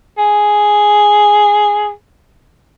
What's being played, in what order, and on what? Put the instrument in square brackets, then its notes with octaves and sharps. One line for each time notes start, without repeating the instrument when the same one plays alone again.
[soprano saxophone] G#4